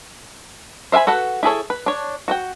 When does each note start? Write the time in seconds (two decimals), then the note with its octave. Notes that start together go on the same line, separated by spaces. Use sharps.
0.92 C5 E5 F5 G#5 B5
1.07 F#4 A4 B4 F#5
1.43 E4 G#4 A4 C#5
1.70 B4
1.86 D4 C#5
2.28 F#4 F#5 G5